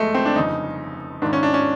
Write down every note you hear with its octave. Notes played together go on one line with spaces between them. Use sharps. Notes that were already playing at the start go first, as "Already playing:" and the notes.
Already playing: F#1 F2 D3 G#3 A3
C4
D4
G1 F2 C#3 D#4
G#1 G#2 D#3 D4
C#4
D4
C#4